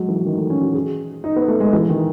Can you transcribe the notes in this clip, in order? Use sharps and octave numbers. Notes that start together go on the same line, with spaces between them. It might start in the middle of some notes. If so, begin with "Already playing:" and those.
Already playing: F#3 G#3
E3
D#3
A3
C#4
F#4
G#4
D#4
B3
A3
G#3
E3
D#3